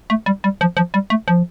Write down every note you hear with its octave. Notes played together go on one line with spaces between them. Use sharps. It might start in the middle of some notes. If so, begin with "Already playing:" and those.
A3
G3
G3
F3
F3
G3
A3
F3